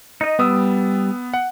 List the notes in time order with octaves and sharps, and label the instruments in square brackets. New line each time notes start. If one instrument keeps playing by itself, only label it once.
[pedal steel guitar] D#4 D#5
[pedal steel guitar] G3 [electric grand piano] B3 D#6 E6
[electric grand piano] F#5